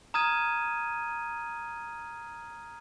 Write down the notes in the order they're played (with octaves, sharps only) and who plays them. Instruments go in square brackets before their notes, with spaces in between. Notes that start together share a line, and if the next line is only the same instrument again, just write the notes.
[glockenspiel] A#5 D#6 F6 G#6 D#7